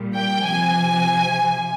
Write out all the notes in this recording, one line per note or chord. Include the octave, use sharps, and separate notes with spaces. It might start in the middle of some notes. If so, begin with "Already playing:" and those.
Already playing: A#2 G3
G5
C3 F3 G#5